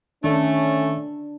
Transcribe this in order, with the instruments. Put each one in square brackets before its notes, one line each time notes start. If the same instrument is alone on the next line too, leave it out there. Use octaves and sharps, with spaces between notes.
[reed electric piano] D#3 [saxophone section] A3 [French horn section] C#4 [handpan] D4